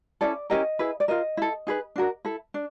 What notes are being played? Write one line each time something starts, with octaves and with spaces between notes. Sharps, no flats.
C#4 E4 A4 D5
C#4 E4 G4 A#4 D#5
E4 G#4 B4
D5
F4 A#4 D#5
E4 A4
D#4 G#4 B4
D4 F#4 A#4
E4 A4
D4